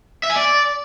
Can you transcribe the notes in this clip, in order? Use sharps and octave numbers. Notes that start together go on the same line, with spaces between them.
E5
G#5
D5